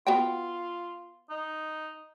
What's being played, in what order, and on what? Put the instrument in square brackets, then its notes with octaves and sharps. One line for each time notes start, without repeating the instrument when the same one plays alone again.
[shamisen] B3 F#4 G5 [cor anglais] F4
[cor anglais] D#4